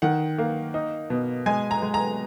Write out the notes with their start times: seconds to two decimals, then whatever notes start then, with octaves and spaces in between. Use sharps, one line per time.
0.02 D#3 F#5
0.38 A#3
0.74 D#4
1.10 B2
1.46 G#3 G#5
1.71 A#5
1.82 G#3
1.94 A#5